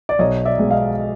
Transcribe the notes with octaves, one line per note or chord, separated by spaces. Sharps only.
D5
B1 C#5 D#5
D5 E5
B2 G#3
D#5 F5